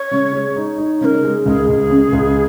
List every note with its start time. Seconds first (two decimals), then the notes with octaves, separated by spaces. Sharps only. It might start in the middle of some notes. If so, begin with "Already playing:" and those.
Already playing: C#5
0.11 C#3
0.33 G#3
0.56 D#4
0.78 D#4
1.01 C#3 A#4 C#5
1.24 G#3
1.45 C#2 G#4
1.68 C#2
1.90 C#3
2.13 C#2